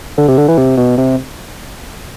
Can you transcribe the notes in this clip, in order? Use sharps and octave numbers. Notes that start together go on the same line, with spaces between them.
D3
C3
D3
E3
C3
B2
C3